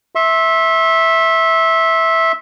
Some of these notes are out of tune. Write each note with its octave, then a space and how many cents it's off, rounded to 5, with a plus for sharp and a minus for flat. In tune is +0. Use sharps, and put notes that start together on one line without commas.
E5 -10 C6 +35